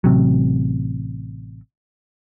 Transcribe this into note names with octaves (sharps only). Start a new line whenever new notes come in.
A1 C3 F#3